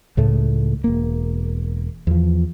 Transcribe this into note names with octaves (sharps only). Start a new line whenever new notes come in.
C#2 A2 A3
E1 A#3
E2 F3